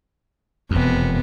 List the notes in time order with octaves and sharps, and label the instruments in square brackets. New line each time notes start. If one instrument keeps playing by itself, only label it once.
[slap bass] E1 F2 [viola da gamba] C3 B3